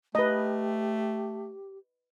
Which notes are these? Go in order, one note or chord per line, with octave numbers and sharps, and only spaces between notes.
A3 G4 B4 D#5